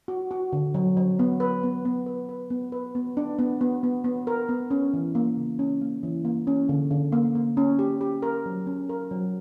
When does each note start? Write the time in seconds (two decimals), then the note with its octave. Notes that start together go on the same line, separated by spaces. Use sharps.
0.08 F#4
0.31 F#4
0.53 D3
0.74 F#3
0.97 F#3
1.19 B3
1.40 B4
1.63 B3
1.85 B3
2.06 B4
2.29 B4
2.50 B3
2.72 B4
2.95 B3
3.17 D4
3.39 B3
3.61 B3
3.83 B3
4.04 B3
4.27 A#4
4.49 B3
4.71 C#4
4.94 E3
5.15 A#3
5.37 C#3
5.59 C#4
5.81 A#3
6.03 E3
6.25 A#3
6.47 C#4
6.69 D3
6.91 D3
7.12 A#3
7.35 A#3
7.57 C#4
7.79 G4
8.01 G4
8.23 A#4
8.46 F#3
8.67 C#4
8.89 A#4
9.11 F#3